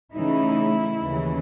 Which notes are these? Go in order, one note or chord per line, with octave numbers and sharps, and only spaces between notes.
C#3 E3 A3 D#4 E4
D#2 C#3 E3